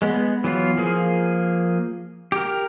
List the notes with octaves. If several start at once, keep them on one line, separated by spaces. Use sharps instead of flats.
G#3 B3
E3 F#3 B3 F4
F3 A#3 G#4
G4 A#4